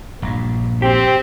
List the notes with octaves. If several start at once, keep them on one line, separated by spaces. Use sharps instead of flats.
A#1 G2
C4 G4